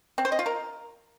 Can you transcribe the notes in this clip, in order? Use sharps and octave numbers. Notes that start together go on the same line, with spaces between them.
C4
C5
D#5
F4
A#4